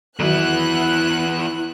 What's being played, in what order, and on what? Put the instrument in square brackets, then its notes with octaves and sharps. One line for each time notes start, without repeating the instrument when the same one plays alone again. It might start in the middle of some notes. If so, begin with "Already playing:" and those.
[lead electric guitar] E2 E4 [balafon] D#3 F#3 F#4 [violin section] B3 F#6